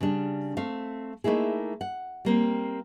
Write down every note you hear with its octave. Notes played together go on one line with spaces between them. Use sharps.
C#3 G3 D4
A3 C4 F5
A3 A#3 D#4 E4 G#4
F#5
G3 A#3 C4